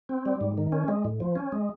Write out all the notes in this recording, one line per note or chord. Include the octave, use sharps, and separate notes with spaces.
C4
G3
G#2
D#3
C#4
G#3
A2
F3
C#4
G#3